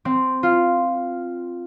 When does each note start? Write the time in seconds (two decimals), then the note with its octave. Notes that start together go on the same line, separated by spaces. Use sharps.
0.05 C4
0.43 F4